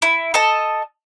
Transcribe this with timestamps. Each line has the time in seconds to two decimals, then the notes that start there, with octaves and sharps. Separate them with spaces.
0.02 E4
0.34 A4 D#5 A5